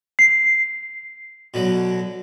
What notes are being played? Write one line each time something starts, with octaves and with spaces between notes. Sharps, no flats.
C7
B2 D3 F#3